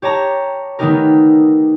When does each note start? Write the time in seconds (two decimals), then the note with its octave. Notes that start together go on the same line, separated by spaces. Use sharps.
0.02 G4 C#5 A5 A#5
0.79 D#3 A3 B3 D#4 G4 A#4